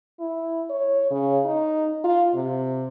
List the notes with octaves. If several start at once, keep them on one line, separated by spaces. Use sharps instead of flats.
E4
C#5
C#3
D#4
F4
C3